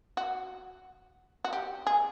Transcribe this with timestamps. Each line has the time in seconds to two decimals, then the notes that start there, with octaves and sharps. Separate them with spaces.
0.17 F#4
1.44 F#4
1.53 G4
1.87 G#4